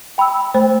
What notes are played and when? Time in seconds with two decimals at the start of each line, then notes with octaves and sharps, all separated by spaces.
0.18 G5 B5 E6
0.54 A3 C5